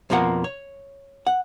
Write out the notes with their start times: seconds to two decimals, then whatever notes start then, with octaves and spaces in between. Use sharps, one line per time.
0.10 F2 B2 F3 A#3 F#5
0.44 C#5
1.27 F#5